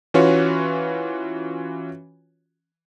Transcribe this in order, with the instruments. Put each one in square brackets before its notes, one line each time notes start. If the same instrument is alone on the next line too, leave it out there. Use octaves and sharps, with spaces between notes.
[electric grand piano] E3 C#4 F4 F#4 B4 C#5